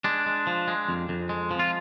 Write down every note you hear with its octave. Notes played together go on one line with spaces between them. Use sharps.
G#3 D4
G#3
F3
G#3
F2
F2
G#3
F3
F4